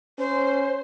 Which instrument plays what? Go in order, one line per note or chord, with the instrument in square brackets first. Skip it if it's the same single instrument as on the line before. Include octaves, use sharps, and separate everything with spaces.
[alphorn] C#4 [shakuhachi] C5